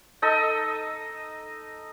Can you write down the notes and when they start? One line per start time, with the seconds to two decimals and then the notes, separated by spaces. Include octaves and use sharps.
0.22 D#4 A4 D#5 E6